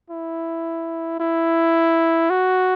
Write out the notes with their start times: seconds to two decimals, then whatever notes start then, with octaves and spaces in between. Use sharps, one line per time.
0.10 E4
1.20 E4
2.30 F#4